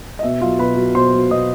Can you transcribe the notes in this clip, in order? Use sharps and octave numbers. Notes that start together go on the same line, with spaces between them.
D#5
B2 E5
F#3 F4 F5
B2 B4 B5
F#3
B2 C5 C6
F#3
B2 D#5 D#6